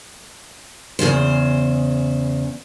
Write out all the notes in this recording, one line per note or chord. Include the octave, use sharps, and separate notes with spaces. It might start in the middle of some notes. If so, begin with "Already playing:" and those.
E2 A#2 C#3 C5